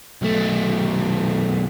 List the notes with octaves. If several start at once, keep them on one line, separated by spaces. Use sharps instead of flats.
B1 A3